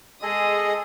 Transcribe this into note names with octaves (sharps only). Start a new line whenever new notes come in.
G#3 G#4 A4 D#5 D#6